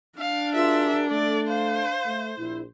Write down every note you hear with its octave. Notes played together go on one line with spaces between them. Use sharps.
D4 F5
F4 F#4 G#4 A#4 E5
A3 A4 D5
C5 F5
A3
A#1 E4